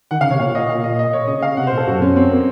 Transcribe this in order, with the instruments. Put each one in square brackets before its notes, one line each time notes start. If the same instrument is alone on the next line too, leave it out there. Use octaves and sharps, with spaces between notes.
[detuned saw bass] D#3 [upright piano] F#5
[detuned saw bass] C#3 [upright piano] F5
[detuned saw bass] C3 [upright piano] C#5
[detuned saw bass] A#2 [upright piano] F5
[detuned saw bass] A#2 [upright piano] D#5
[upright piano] F5
D#5
D#5
C#5
[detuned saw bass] C#3 [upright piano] D#5
[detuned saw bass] C#3 [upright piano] F5
[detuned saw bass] C3 [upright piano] F#5
[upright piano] C5
[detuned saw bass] A#2
[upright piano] A4
[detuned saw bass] F#2 [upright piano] F#4
[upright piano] C#4
C4
A#3